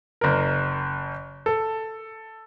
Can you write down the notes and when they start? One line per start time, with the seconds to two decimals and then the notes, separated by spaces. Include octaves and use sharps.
0.21 F#1 A#4
1.46 A4